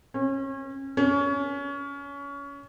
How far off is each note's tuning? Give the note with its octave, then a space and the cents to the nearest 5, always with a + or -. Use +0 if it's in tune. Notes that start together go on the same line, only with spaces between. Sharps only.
C#4 -30
C#4 +25